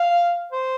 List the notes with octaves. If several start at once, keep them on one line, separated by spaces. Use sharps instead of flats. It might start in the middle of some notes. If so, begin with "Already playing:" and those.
Already playing: F5
C5